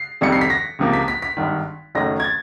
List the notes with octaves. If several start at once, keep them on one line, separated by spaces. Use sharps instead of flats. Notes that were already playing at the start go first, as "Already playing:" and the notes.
Already playing: C7
F1 F2 C3 D#3 G3 C#7
C7
B6
A#6
C#2 C3 F3 A#3
B6
B6
B6
G#1 G2 D#3
F#1 F#2 D#3 F#3 A3 A#6
G#6
A6